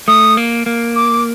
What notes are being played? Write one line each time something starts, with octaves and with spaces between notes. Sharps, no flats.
A3 D#6
A#3
A#3
D6